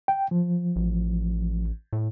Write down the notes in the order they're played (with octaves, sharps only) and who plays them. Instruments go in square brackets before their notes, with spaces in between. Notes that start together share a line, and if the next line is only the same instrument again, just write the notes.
[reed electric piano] G5
F3
[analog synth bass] A1
A2